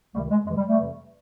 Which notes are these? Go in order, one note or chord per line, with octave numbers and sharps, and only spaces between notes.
C#2 C3 D#3 G3 A3
G#3
F2 C3 E3 G#3
G3
G3 A3
F2 C3 E3